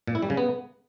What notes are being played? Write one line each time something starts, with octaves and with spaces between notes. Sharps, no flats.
A#2
E4
G3
C#3
B3